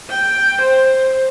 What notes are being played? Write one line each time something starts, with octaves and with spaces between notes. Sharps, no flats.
G5
C5